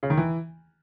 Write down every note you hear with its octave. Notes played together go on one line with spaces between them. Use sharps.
C#3
D#3
E3